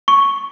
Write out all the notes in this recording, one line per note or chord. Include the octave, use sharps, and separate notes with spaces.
C#6